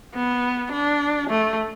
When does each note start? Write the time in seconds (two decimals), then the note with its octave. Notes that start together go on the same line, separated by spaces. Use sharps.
0.14 B3
0.72 D4
1.30 A3